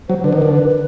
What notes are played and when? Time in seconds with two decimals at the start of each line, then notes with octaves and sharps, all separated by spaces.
0.09 F#3 C5
0.24 D3 B4
0.33 D#3
0.40 D3 A#4
0.55 B4
0.69 B4